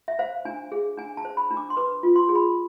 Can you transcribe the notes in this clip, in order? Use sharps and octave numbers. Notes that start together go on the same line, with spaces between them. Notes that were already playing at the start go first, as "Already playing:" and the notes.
E5
C5 F5
D4 G#5
G#4
D4 G#5
A5
C5
B5
D4
D6
C6
B4 D6
F4
C6
G#4
B5